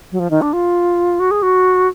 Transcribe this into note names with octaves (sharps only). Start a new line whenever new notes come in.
F#3
F3
D#3
D4
F4
F#4
G#4
F#4